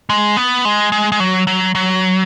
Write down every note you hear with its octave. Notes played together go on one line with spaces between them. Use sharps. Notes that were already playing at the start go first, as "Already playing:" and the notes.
G#3
B3
G#3
G#3
G#3
F#3
F#3
F#3